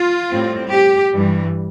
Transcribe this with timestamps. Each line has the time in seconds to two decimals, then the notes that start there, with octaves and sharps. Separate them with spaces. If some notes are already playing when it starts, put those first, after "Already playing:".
Already playing: F4
0.31 A2 G3 C4
0.71 G4
1.13 G2 E3 G3